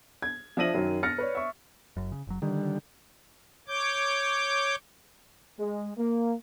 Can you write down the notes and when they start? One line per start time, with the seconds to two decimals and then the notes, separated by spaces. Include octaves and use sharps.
0.22 G#6
0.57 F3 D4 E5 A#6 D#7 F#7
0.74 F#2 D#3 F#3
1.03 F6 A6 A#6 C#7
1.18 B4 C#5 D5
1.35 E5 C#6
1.97 F#1 F#2
2.12 C#3
2.27 F#1 F#3
2.42 D3 D#3 G3
3.68 C#5 D6 G6
5.58 G#3
5.97 A#3